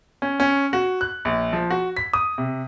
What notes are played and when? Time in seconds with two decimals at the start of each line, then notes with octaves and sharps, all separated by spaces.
0.22 C#4
0.40 C#4
0.73 F#4
1.01 F#6
1.25 A#1
1.53 F3
1.70 F#4
1.97 B6
2.13 D#6
2.38 C3